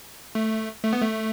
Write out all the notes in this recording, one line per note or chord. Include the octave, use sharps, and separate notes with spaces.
A3
A3
B3
A3